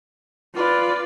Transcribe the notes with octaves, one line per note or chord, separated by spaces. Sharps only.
F4 B4 D5